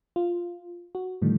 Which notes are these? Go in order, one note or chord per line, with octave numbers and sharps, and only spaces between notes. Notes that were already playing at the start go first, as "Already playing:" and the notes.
F4
F#4
A2 D3 D#3 F3 G3 A3